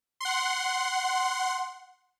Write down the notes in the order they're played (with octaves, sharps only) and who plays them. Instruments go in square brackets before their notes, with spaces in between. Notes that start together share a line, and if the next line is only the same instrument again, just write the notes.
[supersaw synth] F#5 C6